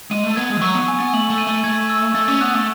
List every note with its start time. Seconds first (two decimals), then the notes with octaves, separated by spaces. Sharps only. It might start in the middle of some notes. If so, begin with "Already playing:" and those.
0.11 G#3 D#7
0.24 A3
0.36 B3 G#6
0.50 G#3
0.57 E3
0.61 F#3 C#6
0.74 B3
0.88 G#5
1.00 B3
1.13 A3 F#7
1.30 A3
1.38 D#7
1.47 A3
1.64 A3 G#6
1.90 E6
2.15 A3 A6
2.28 C#4
2.41 B3 F#6
2.54 A3